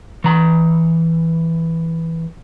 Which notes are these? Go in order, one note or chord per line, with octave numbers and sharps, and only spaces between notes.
E3 A#5